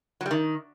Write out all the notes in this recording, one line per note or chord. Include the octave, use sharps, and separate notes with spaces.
F#3
G3
D#3